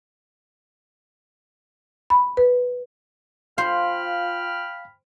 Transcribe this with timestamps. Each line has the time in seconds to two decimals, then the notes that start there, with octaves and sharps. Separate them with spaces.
2.10 B5
2.37 B4
3.58 F4 C5 F5 G5 B5 F6